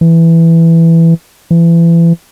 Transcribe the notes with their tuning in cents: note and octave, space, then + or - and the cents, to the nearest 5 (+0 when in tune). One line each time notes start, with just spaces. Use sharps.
E3 +5
E3 +30